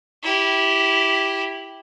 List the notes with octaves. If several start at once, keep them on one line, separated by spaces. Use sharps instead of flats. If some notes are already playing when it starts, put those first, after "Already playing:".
E4 G4